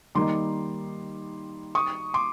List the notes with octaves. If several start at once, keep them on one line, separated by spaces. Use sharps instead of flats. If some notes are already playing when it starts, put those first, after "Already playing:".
D#3 G3 A#3 D#4 C6 D6
C#6 D#6
C6 D6